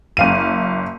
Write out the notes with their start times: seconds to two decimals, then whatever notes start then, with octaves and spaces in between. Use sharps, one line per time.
0.17 F#1 F5 D#7